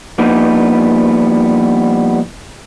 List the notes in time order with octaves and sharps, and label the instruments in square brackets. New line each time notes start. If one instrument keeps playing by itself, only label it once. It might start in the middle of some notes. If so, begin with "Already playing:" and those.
[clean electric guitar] F3 G3 A#3 B3 D#4